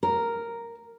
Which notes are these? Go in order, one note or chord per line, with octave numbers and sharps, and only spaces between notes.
A#4